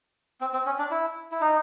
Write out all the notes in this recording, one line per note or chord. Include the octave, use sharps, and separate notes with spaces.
C4
C4
C#4
D4
E4
E4
D#4